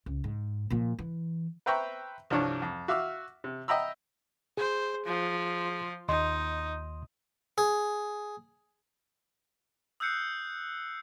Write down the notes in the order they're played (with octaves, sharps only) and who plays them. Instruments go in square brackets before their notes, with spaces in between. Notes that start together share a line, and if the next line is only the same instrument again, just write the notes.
[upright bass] C#2
G#2
A#2 F3
E3
[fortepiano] B4 C5 E5 G5 A#5 C#6
C2 G2 F3 D4 C#5
F2
F#4 E5 F5 D6 E6 F6
C3
D#5 E5 G5 A#5 B5 E6
[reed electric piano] G#4 [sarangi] C5
[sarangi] F3
[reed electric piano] D#2 D#5 C6 [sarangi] D#4
[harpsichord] G#4
[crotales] D#6 E6 F#6 G6 C7 C#7